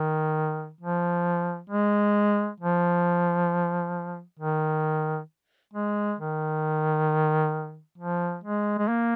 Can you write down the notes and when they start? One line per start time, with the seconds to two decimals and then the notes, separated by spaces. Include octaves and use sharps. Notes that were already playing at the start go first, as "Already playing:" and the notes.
Already playing: D#3
0.81 F3
1.70 G#3
2.60 F3
4.39 D#3
5.74 G#3
6.19 D#3
7.98 F3
8.44 G#3
8.78 G#3
8.88 A#3